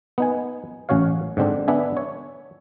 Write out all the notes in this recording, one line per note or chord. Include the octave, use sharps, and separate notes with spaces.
B3 D#4 G#5
A1 C#4 F#4 C#5 F5
G#2 D3 C4 D4
B3 D4 E5 G#5
C#5